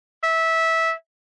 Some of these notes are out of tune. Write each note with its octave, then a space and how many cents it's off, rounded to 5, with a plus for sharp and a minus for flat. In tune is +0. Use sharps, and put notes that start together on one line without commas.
E5 -15